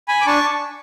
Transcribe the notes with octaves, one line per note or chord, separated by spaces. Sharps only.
G#5 B5
D6
D4 A5 C#6